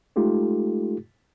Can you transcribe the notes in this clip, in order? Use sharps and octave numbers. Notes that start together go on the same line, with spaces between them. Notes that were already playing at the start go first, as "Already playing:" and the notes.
G#3 A3 D#4 F4 G4 A4